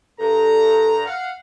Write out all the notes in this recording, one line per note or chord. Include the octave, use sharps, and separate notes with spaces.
G2 A4 A#5
F5 F#5